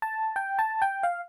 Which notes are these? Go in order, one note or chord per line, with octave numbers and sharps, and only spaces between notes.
A5
G5
A5
G5
F5